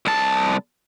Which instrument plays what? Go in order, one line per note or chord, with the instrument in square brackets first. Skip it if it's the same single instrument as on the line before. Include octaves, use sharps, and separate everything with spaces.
[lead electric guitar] C2 A5